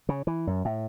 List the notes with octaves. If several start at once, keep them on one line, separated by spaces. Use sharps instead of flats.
C#3
E3
F#2
A2